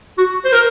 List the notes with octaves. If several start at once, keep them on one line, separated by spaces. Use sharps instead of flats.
F#4
C5
A#4